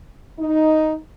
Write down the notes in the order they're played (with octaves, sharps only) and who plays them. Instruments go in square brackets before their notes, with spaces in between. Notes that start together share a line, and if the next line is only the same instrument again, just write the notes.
[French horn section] D#4